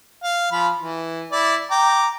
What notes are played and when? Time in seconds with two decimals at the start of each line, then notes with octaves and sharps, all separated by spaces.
0.23 F5
0.52 F3 F5 B5
0.79 E3
1.32 E4 D5
1.71 G5 A#5 D6